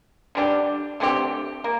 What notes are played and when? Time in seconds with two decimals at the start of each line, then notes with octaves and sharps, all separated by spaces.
0.35 D3 G3 D4 G4
1.00 D3 A3 C4 G4
1.64 A#3